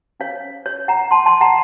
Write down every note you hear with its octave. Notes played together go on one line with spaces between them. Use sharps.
C#4 A4 C5 C#5 F5
C#5
F#5 A#5
A5 C6
A5 C6
F#5 A#5